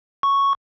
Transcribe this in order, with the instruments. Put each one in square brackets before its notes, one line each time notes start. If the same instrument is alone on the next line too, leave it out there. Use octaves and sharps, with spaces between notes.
[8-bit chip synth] C#6